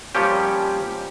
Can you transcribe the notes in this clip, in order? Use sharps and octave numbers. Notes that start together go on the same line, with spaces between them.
F3 G3 A#3 C#4 G4